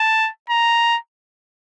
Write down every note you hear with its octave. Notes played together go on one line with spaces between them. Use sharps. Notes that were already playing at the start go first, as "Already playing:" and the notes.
Already playing: A5
A#5